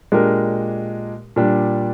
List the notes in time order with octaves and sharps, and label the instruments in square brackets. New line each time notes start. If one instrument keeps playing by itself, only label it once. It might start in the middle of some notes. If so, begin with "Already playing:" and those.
[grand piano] A#2 G#3 D4 G4 A#4
A#2 G3 D4